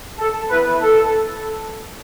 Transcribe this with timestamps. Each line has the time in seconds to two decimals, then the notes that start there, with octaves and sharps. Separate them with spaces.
0.18 A4
0.49 E3 B3 E4 B4
0.81 A4